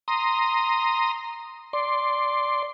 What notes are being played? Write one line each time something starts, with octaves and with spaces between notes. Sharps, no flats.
A#5 C6 D#6
D5 C6